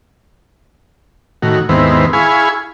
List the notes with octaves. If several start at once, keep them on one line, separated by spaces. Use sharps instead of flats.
A2 D#3 F#4
D#2 G#2 D#3 B3 C4 E4
E4 G#4 F5 G#5 B5 C#6